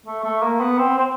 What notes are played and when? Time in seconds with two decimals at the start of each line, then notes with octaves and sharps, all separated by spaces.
0.06 A3
0.24 A3
0.43 A#3
0.60 B3
0.78 C4
0.98 C4